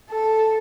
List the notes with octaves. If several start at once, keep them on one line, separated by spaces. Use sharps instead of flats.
A4